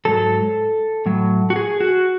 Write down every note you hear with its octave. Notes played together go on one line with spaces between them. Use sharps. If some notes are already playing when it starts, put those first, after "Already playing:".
G#2 F#3 A4
A2 F#3
F#4
G#4
F#4